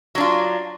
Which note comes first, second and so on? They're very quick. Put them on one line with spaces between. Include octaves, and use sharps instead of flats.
F#3 D4 F4